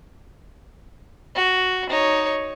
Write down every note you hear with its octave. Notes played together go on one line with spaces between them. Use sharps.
F#4
D#4 C#5